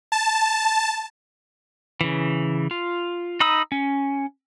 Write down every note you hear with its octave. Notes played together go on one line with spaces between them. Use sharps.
A5
C#3 E3
F4
D#4 A#5 B5 D#6 E6
C#4